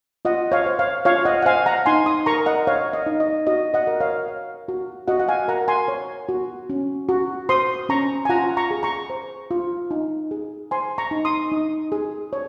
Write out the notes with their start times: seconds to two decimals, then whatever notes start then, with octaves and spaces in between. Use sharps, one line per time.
0.25 F4 D#5 F#5
0.52 C#5 F5
0.66 C5
0.79 C#5 F5
1.05 F4 C#5 F5
1.25 D#5 F#5
1.42 F#5
1.45 C5 F5 G#5
1.66 F#5 A#5
1.86 D#4 G#5 C6
2.06 C6 D#6
2.26 A#4 A#5 C#6
2.46 D#5 F#5
2.67 C#5 F5
2.93 D#5
3.06 D#4
3.20 D#5
3.47 F#4 D#5
3.74 D#5 F#5
3.87 A#4
4.00 C#5 F5
4.28 C#5
4.68 F#4
5.08 F#4 D#5 F#5
5.20 F#5
5.28 F5 G#5
5.48 A#4 F#5 A#5
5.68 G#5 C6
5.88 C#5
6.29 F#4
6.70 C#4
7.09 F#4
7.49 C5 C6 D#6
7.89 C#4 A#5 C#6
8.25 G#5
8.29 F4 F#5 A#5
8.57 A#5 C#6
8.71 G#4
8.83 A#5 C#6
9.10 C5
9.51 F4
9.91 D#4
10.31 G#4
10.71 C5 G#5 C6
10.98 A#5 C#6
11.11 D#4
11.25 C6 D#6
11.52 D#4
11.92 G#4
12.33 C#5